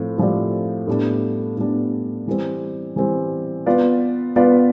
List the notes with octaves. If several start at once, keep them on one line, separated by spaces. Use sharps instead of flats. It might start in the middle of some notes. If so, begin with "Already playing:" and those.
Already playing: A2 F3 C4
A2 F3 C4 G4 D5
A2 G3 B3 D4
A2 G3 B3 D4
E3 G3 C4
E3 G3 C4
B3 F4 B4 D5
B3 F4 B4 D5